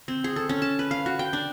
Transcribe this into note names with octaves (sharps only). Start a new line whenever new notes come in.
C4
G#4
A4
C#4
A5
B4
F5
F#4
G5
D4